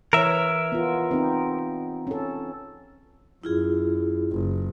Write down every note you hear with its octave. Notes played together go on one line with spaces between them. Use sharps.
E3 A#4 C#5 E5
B3 F4
C4 D#4
C#4 A4
F#2 E4 F4 G#4
F#1